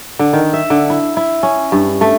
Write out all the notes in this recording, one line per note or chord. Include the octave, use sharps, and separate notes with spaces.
D3
D#3
E5
D3
E4
E4
C#4
G2
A3